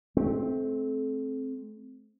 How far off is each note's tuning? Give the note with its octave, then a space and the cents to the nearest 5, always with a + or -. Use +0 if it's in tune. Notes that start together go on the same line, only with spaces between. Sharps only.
A3 -35 C4 +0